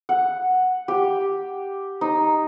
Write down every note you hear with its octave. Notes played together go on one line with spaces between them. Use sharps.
F#5
G4
D#4